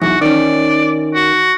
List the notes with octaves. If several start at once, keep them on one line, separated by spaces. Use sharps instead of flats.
B1 E2 F#4
D#3 C#4 D5
F#4